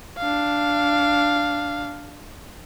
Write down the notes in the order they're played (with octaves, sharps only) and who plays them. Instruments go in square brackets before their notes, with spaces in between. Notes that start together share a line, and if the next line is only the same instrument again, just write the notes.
[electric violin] D4 F5